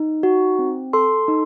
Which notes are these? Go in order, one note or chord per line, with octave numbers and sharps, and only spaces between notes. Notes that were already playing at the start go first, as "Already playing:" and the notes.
Already playing: D#4
F#4
C4
A4 C6
D#4